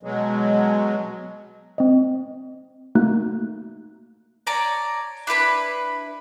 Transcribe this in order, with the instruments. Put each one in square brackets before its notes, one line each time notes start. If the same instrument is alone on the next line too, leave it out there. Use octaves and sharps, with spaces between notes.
[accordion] B2 F#3 G#3
[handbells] C4 D#5
A3 A#3 D#4 F#4 F#6
[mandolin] C#5 D5 A5 A#5
D4 E4 B4 B5